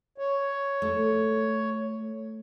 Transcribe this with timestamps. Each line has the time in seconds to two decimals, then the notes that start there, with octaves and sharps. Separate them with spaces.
0.18 C#5
0.82 A3